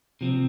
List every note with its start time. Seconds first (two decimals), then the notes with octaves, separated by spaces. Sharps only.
0.21 C3 F3 C4